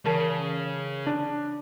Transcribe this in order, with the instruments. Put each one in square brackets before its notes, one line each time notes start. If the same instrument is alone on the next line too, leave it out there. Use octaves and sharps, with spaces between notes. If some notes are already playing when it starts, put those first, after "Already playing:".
[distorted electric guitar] C#3 [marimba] E3 A#4 A5
[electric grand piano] D4